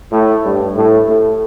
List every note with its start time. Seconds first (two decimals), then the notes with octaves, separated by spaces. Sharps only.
0.12 A2
0.44 G2
0.76 A2
1.08 A2